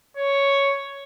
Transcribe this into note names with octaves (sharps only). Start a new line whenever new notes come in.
C#5